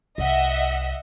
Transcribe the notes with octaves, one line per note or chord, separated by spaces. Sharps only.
C2 D#5 E5 F#5